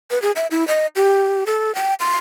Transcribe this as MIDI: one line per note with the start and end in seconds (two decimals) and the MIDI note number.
0.11 0.20 71
0.22 0.32 68
0.36 0.47 76
0.51 0.67 64
0.68 0.87 75
0.96 1.44 67
1.46 1.74 69
1.75 1.94 79
2.00 2.17 84